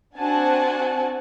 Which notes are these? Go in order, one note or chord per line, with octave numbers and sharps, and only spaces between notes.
C4 D4 F#4 F#5 G#5 A5